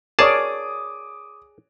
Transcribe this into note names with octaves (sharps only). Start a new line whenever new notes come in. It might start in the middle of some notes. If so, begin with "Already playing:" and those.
G#4 A#4 C#5 D5 A5 D6 D#6